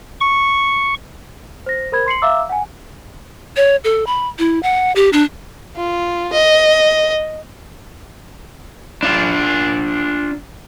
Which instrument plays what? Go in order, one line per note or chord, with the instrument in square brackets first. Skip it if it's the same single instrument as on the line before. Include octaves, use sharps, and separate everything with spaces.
[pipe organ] C#6
[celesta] C5 A#6
A#4 C5 B5 G#6
C6 C7 C#7 F#7
E5 F5 A#5 D6 E6
F#5 G#5
[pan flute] C#5
A4
B5
E4
F#5
G4
D4
[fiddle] F4
D#5
[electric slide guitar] D4 F4